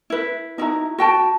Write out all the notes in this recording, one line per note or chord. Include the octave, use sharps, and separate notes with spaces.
E4 B4
D#4 E4 F#4 A#5
F#4 G5 A5